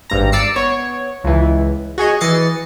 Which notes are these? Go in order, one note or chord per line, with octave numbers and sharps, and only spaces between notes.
G#1 G2 A#5
D5 D6 E6 C7 C#7
B3 C#5
C#2 E3
F#4 G#4 C#5 D#5
E3 D#5 A6 C7 C#7